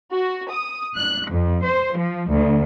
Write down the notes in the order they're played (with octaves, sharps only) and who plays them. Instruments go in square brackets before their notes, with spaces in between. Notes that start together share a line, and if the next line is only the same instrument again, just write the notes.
[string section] F#4
D#6
F#6
F2
C5
F3
D2